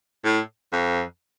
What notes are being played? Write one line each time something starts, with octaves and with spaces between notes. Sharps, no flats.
A2
F2